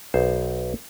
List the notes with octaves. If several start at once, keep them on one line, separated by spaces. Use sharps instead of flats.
B1 C5